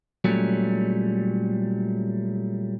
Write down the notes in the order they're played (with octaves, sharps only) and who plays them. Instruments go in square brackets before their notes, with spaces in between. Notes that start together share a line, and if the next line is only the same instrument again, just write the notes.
[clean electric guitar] A#2 F#3 G3 A3 C#4